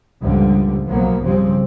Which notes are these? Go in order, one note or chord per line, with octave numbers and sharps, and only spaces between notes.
C#2 G2 A#2 D3 F3 G3
B1 A#2 F3 F#3 A#3 B3
G2 C#3 F3 G3 C4